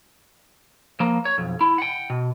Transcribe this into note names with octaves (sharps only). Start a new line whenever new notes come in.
F3 A#3
C#5
B1 F2
E4
F#5 G5
B2